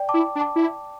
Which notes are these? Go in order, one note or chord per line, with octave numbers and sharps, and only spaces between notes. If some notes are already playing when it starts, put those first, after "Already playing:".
Already playing: D5 G5
A5 D6
E4
D4
A5 D6
E4